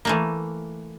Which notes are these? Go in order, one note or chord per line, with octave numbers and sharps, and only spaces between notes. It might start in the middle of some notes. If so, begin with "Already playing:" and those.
E3 A3 A#3